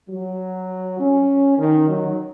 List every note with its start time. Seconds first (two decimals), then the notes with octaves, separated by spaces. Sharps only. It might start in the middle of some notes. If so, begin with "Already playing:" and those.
0.09 F#3
0.99 C#4
1.58 D#3
1.88 F#3